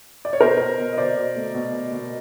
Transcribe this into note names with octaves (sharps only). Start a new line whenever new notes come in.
D5
C#5
B2 A#4 C5
B2
B2
D#5
B2 C5 D5
B2
A3
B2
B2
B2